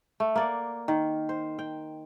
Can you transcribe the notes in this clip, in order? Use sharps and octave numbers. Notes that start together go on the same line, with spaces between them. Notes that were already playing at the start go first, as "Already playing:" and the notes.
A3
A#3 D5 F#5
D#3
C5
G5